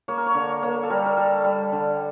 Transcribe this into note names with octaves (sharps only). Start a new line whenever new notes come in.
A#3 C#5
A#4
C#5
D3
A#3 C#5
A4
G3 A#4
A#4
G3 A4
G3
D3